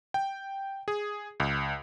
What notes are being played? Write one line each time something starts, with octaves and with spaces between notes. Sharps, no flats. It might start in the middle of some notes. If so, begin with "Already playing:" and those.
G5
G#4
C#2